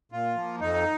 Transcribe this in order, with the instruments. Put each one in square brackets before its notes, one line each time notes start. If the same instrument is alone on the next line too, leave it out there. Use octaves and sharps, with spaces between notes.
[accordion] A#2 F4
F3 A#3
F2 D#4